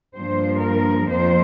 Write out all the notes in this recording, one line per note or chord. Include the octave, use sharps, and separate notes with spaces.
G2 F3 A#3 C5
A#4
F2 F3 A#3 C5